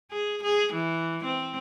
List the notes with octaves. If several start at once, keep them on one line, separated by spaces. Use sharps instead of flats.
G#4
G#4
E3
C4